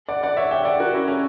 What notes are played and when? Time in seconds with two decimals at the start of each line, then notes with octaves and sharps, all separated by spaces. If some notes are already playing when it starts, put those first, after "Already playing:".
0.08 D5 F#5
0.23 D5 F#5
0.37 C#5 E5
0.51 E5 G5
0.65 D5 F#5
0.79 F#4 A#4
0.94 C#4 E4
1.08 C#4